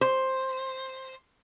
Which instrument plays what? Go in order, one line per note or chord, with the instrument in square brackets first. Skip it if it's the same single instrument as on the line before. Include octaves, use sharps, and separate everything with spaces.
[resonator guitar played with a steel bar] C5